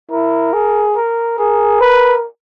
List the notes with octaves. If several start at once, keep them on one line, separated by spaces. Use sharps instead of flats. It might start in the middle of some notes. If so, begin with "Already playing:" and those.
E4 A#4
G#4
A#4
G#4 A#4
B4